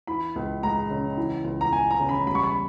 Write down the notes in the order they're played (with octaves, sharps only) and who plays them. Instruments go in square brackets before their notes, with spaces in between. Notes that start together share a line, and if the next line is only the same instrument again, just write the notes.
[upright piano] E3 B5
C#2
G#3 A#5
C#3
E3
C#2
A#5
C#2 G#5
A#5
C#3
B5
G3 B5
C#6
B5